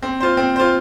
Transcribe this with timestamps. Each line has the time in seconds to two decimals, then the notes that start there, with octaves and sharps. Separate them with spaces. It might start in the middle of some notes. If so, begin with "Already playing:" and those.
0.02 C4
0.20 F4 C5
0.37 C4
0.56 F4 C5